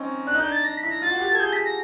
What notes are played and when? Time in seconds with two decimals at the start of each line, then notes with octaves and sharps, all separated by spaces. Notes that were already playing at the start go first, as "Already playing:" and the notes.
Already playing: C4 C#4 D#4
0.27 D4 F#6
0.35 D#4
0.40 D4 G6
0.51 A6
0.64 D4 A#6
0.77 B6
0.83 E4
0.90 A#6
1.02 F4 A6
1.11 F#4
1.20 G4
1.31 A4
1.35 G#6
1.40 G#4 G6
1.52 G#4 B6
1.65 A#6